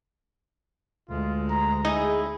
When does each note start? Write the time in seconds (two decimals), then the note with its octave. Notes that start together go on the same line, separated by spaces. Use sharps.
1.10 D2 G#3 F4
1.50 A#5
1.85 D#4 E4 G#4